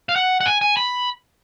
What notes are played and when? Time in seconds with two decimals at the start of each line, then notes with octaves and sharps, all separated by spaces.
0.09 F5
0.16 F#5
0.41 F#5
0.46 G#5
0.61 G#5
0.77 B5